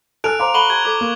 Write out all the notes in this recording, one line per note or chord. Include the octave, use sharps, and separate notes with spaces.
D#4 A4 G#5 A5 F6 F#6 D7 F7
C5 F5 A#5 C6 D6
A4 F#5 B5 C#6 F#7 G7
G4 A5 G#6
F4 A4 D6
A#3